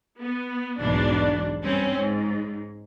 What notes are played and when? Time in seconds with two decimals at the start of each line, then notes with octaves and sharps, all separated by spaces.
0.20 B3
0.78 B1 E2 G#2 B2 D4
1.61 G2 C4 C#4
1.98 G#2